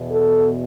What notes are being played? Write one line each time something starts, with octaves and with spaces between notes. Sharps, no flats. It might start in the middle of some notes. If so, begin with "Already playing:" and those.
Already playing: E2 B2
A4